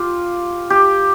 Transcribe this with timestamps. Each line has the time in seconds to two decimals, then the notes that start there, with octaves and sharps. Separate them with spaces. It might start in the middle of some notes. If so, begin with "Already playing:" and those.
Already playing: F4 G4
0.70 G4